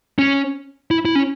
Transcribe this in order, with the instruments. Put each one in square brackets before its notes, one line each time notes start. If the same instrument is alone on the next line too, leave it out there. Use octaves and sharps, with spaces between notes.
[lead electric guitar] C#4
E4
E4
C#4